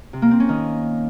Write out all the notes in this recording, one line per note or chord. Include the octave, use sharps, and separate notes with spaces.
C3
A#3
C4
C#4
D#3